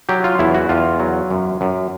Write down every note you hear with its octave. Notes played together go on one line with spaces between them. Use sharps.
F#3 G4
F4
E2 E4
F#4
E2 F4
F#3
F#2
F#2